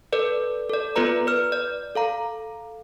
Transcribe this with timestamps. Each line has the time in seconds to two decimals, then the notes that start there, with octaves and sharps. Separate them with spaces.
0.13 A4 B4 D5
0.69 A4 D5
0.96 B3 F4 A4 B4 D5 A#5
1.27 B4 F6
1.52 D5
1.95 A4 F5 A#5